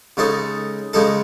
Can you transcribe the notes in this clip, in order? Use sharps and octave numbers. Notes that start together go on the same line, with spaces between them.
C#3 G#3 D#4 A4
C#3 G#3 D#4 A4